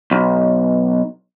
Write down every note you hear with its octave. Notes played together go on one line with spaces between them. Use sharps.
B1